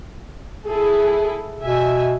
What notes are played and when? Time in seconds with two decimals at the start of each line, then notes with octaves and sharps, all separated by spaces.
0.67 E4 G#4 A4
1.62 B2 E5 G#5